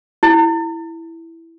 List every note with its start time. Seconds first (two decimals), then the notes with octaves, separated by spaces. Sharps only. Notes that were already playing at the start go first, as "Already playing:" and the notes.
0.23 E4